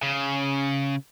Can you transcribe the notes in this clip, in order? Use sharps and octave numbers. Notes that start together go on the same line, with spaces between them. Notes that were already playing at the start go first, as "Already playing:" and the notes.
C#3